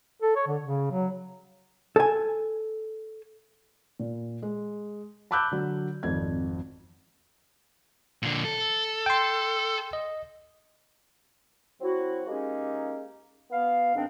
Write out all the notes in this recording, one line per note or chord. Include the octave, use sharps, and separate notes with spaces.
A4
C#5
D3
C#3
F#3
A4 G#5
A#2
G#3
A5 B5 D6 E6 F#6 G6
D3 F#3
G#1 F2 G#6
A#2 D3
A4
G5 C6
D#5
F#3 C4 E4 F#4
G#3 A#3 C#4 D#4 G4 G#4
B3 F5
G#2 D#3 B3 C4 D4